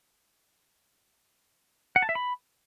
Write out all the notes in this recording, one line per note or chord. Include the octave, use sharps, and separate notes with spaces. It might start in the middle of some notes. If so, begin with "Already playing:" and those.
F#5
A5
E5
B5